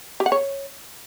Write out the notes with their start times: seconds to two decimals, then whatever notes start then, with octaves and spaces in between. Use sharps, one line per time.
0.20 G4
0.26 F#5
0.32 C#5